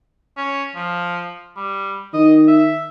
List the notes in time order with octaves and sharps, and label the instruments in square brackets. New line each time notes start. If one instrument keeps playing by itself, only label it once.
[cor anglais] C#4
F3
G3
[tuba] D#3 [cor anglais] D#5
[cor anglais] E5